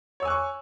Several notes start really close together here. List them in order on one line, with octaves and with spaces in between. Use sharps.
C#5 E6 G#5 F#6 C#6